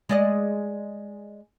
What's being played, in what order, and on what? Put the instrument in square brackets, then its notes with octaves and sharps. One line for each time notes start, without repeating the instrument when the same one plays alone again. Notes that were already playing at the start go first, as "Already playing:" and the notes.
[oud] G#3 D5 D#5